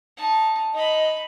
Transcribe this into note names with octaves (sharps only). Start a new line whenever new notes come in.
D#4 A5
D#4 D#5 B5